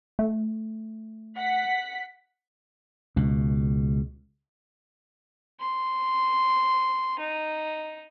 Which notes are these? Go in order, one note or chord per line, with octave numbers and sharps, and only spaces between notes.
A3
F#5 B6
C#2 B2
C6
D#4